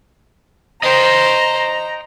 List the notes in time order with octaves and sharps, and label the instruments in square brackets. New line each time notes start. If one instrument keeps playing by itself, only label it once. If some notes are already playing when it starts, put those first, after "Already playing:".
[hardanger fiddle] C5 [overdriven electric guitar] D#5 G5 [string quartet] A#5